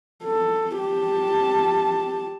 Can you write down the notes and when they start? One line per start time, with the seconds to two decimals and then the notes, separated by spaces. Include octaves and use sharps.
0.24 A4
0.78 G4 A5